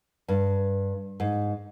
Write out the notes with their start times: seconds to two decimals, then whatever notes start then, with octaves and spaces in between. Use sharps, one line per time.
0.28 G2
1.20 G#2